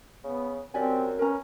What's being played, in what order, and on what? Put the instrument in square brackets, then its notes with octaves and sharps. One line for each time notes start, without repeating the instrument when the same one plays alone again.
[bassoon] C#3 [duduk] B3
[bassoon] F#2 [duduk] C4 [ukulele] G4 D5 G#5
[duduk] C#4 [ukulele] A#4 B4 A#5